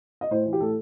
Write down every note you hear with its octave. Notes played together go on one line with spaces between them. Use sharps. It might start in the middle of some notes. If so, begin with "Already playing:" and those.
D#5
A2 C5
E3
G4
A2 A4